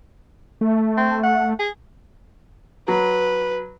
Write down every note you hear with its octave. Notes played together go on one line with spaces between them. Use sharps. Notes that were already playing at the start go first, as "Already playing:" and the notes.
A3
C4
F#5
G#4
F#3 B4